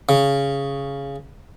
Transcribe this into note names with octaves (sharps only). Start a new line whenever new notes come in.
C#3